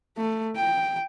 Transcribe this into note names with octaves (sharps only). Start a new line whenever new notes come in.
A3
G5